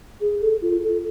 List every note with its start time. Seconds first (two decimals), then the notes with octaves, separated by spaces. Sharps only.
0.21 G#4
0.41 A4
0.62 F4
0.82 A4